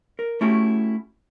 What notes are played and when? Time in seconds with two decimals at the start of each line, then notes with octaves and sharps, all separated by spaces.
0.19 A#4
0.41 A3 C#4 E4 F#4 G4